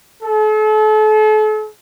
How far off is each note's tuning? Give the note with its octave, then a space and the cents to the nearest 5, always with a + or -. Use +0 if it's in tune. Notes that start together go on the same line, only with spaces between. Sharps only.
A4 -40